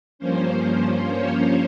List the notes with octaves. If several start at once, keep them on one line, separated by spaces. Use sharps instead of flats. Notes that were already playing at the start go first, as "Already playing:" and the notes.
G2 F3 A#3 C#4 C5
C#5